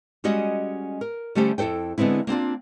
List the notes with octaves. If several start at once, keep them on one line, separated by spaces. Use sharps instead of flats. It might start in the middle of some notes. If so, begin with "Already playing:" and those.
G3 G#3 C#4 F#4 D#5
A#4
D3 G3 A3 C#4 G4 C5
F2 E4 A4 C5 G5
D3 G#3 B3 C4 E4
A#3 C4 D4 F4